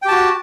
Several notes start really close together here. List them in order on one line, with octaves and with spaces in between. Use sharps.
G5 G4 A5 F#4